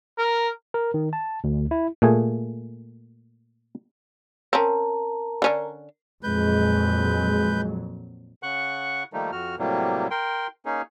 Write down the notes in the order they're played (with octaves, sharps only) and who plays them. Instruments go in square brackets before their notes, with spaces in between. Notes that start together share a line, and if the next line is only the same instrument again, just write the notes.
[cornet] A#4
[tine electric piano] A#4
D#3
A5
D2
E4
[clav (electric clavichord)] A#2 A3 G#4 G#5
[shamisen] C4 C#4 [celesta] A#4 A5 A#5
[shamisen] D3 C#4 D4
[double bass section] F2 A#2 F#3 [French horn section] G#3 [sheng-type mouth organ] B4 G6
[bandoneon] C#3 F#5 C#6 F#6
D#3 F3 G3 A3 A#3 D#4
F2 F#4 F6
A2 C3 F#3 G3 A#3
A#4 G5 C6
A#3 C#4 D#4 G#4